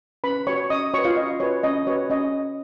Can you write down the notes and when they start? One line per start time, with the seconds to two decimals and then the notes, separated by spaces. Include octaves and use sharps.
0.24 C#4 B4 B5
0.47 F#4 B4 C#5 C#6
0.70 C#4 D#5 D#6
0.94 F#4 B4 C#5 C#6
1.05 F4 F5
1.17 C#4 D#5
1.40 F#4 B4 C#5
1.63 C#4 D#5
1.87 F#4 B4 C#5
2.10 C#4 D#5